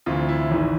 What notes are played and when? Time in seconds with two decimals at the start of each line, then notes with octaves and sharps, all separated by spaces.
0.06 D2 C3 E3 F4
0.28 E4
0.51 G#1 G#2 E3